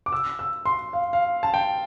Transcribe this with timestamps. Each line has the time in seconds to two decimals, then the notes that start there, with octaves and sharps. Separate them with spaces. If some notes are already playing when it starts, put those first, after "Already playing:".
0.06 D6
0.12 E6
0.39 E6
0.66 C6
0.93 F5
1.13 F5
1.43 A5
1.54 G5